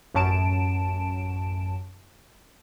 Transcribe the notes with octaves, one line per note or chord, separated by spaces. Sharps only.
A1 F#2 C#4 A5 D7 E7